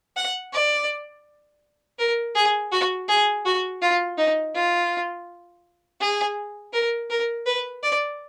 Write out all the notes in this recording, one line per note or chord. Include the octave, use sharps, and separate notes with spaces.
F#5
D5
A#4
G#4
F#4
G#4
F#4
F4
D#4
F4
G#4
A#4
A#4
B4
D5